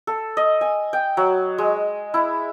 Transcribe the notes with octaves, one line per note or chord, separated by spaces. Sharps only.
A4
D#5
G#5
G5
F#3
G#3
E4